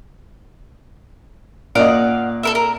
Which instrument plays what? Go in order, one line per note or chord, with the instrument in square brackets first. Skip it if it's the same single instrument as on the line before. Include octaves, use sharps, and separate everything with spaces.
[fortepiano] A#2 D#5 [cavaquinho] D5 F5 F#5
[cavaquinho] A4 A#4 E5
A#4